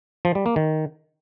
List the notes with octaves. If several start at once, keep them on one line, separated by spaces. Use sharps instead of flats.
F3
G3
A#3
D#3